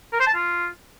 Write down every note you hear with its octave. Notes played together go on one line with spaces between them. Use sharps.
A#4
C5
A5
F4